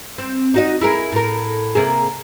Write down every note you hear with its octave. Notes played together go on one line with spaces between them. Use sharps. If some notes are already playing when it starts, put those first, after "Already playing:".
C4
D#4 F#4 D#5
E4 G#4 A#4
A2 A#4
C3 A#3 G#4